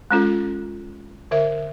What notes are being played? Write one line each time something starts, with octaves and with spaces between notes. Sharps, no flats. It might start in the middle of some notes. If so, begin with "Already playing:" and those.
G#3 C#4 F4 A4
D3 A#4 E5